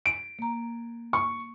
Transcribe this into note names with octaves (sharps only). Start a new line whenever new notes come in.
D7
A#3 A#5
C#6